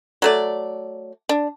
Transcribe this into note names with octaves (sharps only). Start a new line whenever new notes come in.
F#3 A3 D5
D4